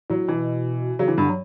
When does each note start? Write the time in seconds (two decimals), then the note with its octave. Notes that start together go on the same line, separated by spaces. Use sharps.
0.10 A2 F#3
0.28 B2 E3
0.99 C#3 F#3
1.08 E3
1.17 G2 D3
1.29 F#3